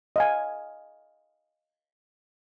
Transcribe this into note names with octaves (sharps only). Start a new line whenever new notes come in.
D#5 F5 G#5